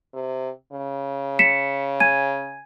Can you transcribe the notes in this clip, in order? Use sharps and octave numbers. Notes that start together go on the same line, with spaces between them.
C3
C#3
B6 C#7 E7
G#5 G#6 D#7